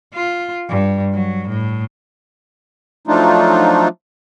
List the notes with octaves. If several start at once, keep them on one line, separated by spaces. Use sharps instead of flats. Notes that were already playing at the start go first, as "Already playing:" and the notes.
F4
G2
F#3
A2
F3 F#3 A3 D4 D#4 F4